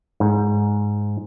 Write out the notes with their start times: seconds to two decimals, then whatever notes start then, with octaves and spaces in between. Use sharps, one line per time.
0.20 G#2